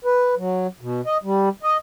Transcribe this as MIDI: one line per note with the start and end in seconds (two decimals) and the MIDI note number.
0.05 0.35 71
0.37 0.67 54
0.81 1.01 47
1.06 1.17 75
1.23 1.49 55
1.63 1.77 75